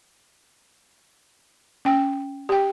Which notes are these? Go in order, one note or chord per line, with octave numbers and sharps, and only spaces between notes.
C#4 G5
G4 G5